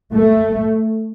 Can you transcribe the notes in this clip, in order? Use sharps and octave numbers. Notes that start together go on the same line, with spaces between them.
A3